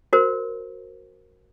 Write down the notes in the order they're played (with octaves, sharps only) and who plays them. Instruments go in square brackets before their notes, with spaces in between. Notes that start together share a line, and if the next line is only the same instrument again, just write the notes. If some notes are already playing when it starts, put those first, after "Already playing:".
[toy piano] F#4 A#4 C5